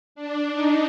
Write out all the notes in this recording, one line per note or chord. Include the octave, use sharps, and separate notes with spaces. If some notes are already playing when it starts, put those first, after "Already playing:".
D4
D#4